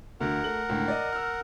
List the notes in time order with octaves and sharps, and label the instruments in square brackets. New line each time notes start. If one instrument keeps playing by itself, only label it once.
[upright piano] D2 D3 [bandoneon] A#4 F#5
[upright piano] A3 F#7
C#2 A2 D3
D5 D#5
E6 F6